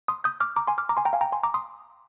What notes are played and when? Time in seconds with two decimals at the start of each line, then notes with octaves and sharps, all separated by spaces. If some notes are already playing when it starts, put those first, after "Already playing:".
0.08 C6 D#6
0.24 D#6 G6
0.40 D6 F6
0.56 A#5 D6
0.67 G#5 C6
0.78 D6 F6
0.89 A#5 D6
0.97 G#5 C6
1.05 G5 A#5
1.13 F5 G#5
1.21 G5 A#5
1.32 G#5 C6
1.43 A#5 D6
1.54 C6 D#6